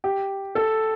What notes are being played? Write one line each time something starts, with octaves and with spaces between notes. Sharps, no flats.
G4
A4